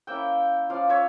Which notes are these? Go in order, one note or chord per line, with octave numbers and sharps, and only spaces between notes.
A#3 C#4 E4 E5 G5
F3 C#4 F4 D5 F5
C#5 E5